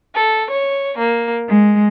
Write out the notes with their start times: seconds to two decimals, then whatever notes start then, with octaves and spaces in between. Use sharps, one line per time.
0.14 A4
0.50 C#5
0.98 A#3
1.50 G#3